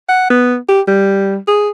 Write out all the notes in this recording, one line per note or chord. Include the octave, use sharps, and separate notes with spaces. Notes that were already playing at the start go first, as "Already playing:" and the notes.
F#5
B3
G4
G3
G#4